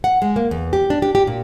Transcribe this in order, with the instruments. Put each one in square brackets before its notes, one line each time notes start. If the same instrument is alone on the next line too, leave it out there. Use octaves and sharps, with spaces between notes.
[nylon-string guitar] F#5
G#3
A#3
E2
G4
D4
G4
G4
A#2